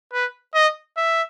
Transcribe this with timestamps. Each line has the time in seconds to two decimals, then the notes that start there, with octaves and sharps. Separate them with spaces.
0.13 B4
0.55 D#5
0.97 E5